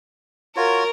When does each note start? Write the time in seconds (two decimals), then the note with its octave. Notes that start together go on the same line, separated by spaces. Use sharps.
0.57 F4 F#4 A#4 C#5